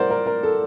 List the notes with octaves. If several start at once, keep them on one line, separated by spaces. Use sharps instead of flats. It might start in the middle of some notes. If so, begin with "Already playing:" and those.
Already playing: A2 G3 A#4 C5 D5 F#5
A#4
A#4
A4